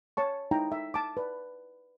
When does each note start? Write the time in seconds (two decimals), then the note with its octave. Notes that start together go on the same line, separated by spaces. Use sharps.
0.17 C#5 A5 C#6
0.51 D#4 E4 G5 A#5
0.72 E5
0.94 A5 D6
1.17 B4 D5